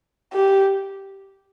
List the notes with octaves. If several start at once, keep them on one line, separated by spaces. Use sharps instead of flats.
G4